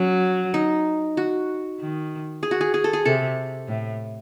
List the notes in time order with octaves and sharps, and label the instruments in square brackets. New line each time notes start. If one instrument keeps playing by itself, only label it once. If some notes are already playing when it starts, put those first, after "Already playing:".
Already playing: [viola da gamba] F#3 [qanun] C#4
[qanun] D#4
F#4
[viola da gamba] D#3
[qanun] G#4
F#4
G#4
G#4
A4
G#4
[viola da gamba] C3 [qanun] A4
[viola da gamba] A2